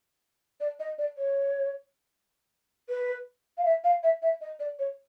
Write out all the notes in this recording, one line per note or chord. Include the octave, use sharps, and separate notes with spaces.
D5
D#5
D5
C#5
B4
F5
E5
F5
E5
E5
D#5
D5
C#5